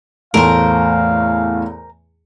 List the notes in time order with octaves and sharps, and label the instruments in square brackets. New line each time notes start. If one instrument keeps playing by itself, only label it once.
[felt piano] E2 A2 A3 [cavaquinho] A#4 C5 [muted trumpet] F5